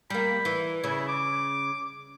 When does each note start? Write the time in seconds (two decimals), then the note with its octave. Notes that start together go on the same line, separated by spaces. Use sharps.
0.10 G3 A#3 B5
0.45 E3
0.84 C#3 E4
1.08 D6